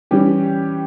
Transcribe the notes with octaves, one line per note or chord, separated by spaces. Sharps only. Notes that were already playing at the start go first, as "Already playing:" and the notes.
E3 G3 C#4 G4